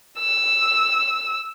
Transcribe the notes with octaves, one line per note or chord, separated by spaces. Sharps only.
E6